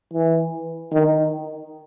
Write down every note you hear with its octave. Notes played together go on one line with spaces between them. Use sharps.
E3
D#3